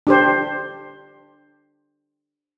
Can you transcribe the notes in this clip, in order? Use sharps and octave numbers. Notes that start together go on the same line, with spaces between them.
D4 G4 C5